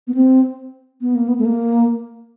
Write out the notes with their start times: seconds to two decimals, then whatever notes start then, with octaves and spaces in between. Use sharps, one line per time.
0.08 B3
0.14 C4
1.01 B3
1.15 A#3
1.28 B3
1.39 A3
1.45 A#3